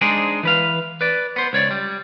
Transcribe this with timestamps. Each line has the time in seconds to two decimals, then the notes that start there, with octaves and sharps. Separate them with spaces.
0.01 G#3 D4 D#4 G#4 C5 D5
0.43 E3 B4 F5
1.01 B4 D5
1.36 B3 C5
1.53 C#2 C#5 D5
1.71 G3